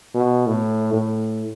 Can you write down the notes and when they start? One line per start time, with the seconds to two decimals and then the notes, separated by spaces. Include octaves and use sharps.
0.14 B2
0.47 A2
0.93 A2